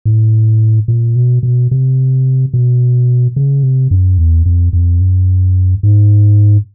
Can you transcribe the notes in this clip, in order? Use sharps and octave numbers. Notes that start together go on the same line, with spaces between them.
A2
A#2
B2
B2
C3
B2
C#3
C3
F#2
E2
F2
F2
F#2
G#2